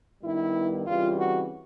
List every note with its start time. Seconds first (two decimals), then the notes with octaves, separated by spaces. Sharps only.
0.22 G2 D#3 G3 B3 E4
0.86 C#3 E3 G3 C4 F4
1.18 F#4